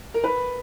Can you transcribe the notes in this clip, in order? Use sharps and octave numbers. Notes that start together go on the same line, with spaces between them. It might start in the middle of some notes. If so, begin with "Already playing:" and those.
A#4
B4